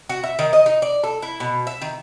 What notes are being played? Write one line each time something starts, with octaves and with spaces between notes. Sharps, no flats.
F#4
E5
D#3
D#5
D#4
D5
A4
E4
B2
E5
D#3